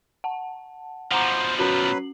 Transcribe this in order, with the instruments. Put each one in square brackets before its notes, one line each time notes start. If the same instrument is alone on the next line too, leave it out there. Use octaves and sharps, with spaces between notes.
[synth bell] F#5 A5
[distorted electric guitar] B2 F3 [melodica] C5 [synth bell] F#5 A#5 D6
[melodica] F#3 B4 [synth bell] C#4 F#4 F#7